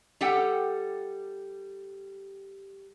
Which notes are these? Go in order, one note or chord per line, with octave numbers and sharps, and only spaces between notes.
G3 G4 A4 F#5 G5